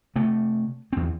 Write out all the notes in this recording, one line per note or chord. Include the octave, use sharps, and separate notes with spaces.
C3 A3
E2 C4